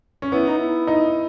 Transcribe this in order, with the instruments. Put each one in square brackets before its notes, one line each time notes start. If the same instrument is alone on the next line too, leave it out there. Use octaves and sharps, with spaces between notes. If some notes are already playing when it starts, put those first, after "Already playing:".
[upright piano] C#4
[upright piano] B3 [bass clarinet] E4
[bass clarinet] D#4
E4
[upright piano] D#4